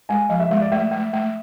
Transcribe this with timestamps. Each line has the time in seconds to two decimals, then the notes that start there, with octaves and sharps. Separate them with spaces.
0.09 G#3 G#5
0.30 F3 F5
0.40 E5
0.51 G#3 E5
0.61 D5
0.72 A3 E5
0.91 A3
1.13 A3